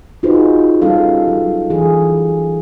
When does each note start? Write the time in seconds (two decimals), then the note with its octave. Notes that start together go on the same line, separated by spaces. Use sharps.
0.23 D#4 F4 F#4 G#4 B4 C5
0.82 G3 C#4 A4 F5
1.28 F#3
1.70 E3 G#4